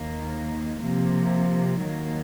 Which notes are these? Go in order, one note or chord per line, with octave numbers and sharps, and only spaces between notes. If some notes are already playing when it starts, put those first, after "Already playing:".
Already playing: D#2 D#3 A#3
C3 F3 A#3
D#2 D#3 F#3 A#3